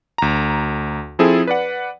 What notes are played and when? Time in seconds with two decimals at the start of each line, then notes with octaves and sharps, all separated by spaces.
0.18 D2 A#5
1.19 F3 C4 E4 G#4 A4
1.47 B4 D5 F#5